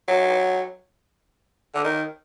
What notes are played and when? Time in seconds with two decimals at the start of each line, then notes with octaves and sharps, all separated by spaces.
0.08 F#3
1.75 D3
1.84 D#3